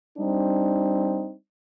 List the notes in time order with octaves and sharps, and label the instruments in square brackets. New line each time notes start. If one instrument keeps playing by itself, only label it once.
[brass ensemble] G3 C4 D4 D#4